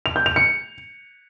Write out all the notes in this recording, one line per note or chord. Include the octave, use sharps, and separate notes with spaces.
F7
G6
F7
C#7